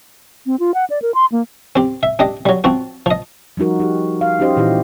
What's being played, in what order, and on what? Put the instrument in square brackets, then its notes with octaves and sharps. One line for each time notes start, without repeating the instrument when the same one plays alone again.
[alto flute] C4
F4
F#5
D5
A#4
C6
A#3
[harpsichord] C4 G4
E5
D4 G4 D#5
F#3 G3
F3 C4 F#4
F3 D#5
[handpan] F3 G3 D#4 F#4 A#4
D#4 G4
F5
C#4 D#4 F#4 G4 C5 D#5
A#2 E3 E4 F4 G4